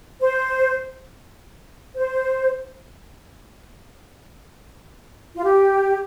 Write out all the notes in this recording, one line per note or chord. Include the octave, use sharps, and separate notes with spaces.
C5
C5
F4
G4